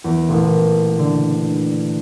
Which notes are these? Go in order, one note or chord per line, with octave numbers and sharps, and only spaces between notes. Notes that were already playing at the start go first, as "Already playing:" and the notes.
E2
A1 A#2
D3